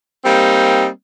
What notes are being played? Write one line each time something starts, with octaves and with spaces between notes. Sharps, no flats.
G3 A#3 C4 D#4